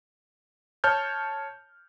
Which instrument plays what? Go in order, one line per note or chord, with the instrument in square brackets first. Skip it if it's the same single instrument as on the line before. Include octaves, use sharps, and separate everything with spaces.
[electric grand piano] C#5 A5 F6 G6